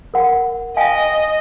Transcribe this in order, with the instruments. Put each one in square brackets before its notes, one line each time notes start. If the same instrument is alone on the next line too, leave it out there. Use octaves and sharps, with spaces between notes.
[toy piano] A#4 F#5
[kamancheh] D#5 [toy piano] F5 G5 G#5